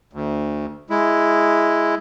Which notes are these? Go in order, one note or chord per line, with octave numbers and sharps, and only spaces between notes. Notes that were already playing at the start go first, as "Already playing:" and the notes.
D2
G#3 E4